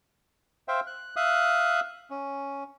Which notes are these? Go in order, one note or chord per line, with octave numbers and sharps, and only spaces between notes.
C5 E5 F5 G5
F#6
E5 F5 D#6 F#6
C#4